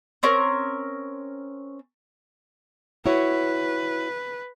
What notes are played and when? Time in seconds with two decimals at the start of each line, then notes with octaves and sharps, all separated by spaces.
0.23 C4 C#4 A#4
3.06 E4 F#4 B4 C#5